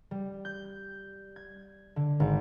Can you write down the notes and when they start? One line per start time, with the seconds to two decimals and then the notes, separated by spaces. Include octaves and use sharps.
0.11 G3
0.45 G6
1.36 G#6
1.96 D3
2.20 G#1